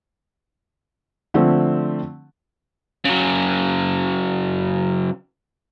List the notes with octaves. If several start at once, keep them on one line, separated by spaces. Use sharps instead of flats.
D3 F3 A3 C4
C#3 F#3